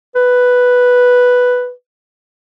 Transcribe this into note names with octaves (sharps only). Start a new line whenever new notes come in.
B4